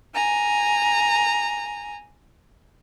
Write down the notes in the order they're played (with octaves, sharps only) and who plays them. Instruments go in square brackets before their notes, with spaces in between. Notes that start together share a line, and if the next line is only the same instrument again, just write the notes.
[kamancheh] G#5 A#5